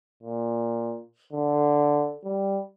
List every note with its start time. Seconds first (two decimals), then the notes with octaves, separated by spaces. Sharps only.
0.23 A#2
1.33 D3
2.24 G3